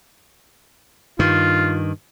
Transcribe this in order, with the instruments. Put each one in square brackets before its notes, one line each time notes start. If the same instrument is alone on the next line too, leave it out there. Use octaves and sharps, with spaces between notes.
[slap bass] G2 D#3 [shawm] F4